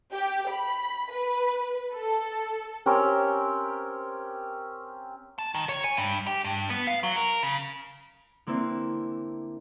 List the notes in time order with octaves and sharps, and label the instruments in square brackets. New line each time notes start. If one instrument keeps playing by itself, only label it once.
[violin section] G4
B5
B4
A4
[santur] C4 C#4 G4 A#4
[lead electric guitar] A5
D#3
C#5
G#5
G2
G4
G2
B3
F5
F#3
A#4
C#3
[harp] D3 A#3 C4 E4